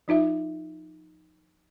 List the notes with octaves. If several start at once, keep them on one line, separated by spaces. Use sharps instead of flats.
F3 D#4 F4 E5